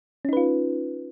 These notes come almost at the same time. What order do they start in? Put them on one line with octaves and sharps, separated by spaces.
C#4 D#4 B4 F4